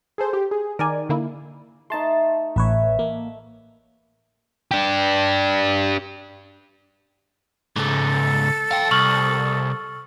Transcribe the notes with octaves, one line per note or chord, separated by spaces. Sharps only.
G#4 A4 C5
G4
G#4
D#3 A#4 D5 G#5
D3 A#3 E4
A3 D#4 A5 C6
A1 B4 C#5 E5
A#3
D4 G4
C#2 G#2 A4
F5 G5
C2 C#6 F6 F#7